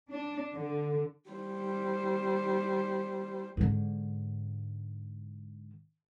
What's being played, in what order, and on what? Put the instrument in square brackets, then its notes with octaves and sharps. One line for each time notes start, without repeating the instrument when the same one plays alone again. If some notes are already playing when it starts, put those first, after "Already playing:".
[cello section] D4
D3
[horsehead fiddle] G3 C5
[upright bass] G#2 D3